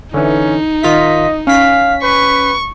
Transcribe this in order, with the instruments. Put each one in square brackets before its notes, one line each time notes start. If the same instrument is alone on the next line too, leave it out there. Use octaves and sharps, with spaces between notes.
[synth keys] D3 E3 [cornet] C#4 [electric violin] D#4
[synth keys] D#3 F4 B6 [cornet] D#5
[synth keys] C#4 B6 [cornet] F5
[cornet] B4 [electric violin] C#6